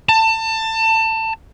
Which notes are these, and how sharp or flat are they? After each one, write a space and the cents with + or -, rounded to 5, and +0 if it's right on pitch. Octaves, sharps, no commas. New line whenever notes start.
A5 +25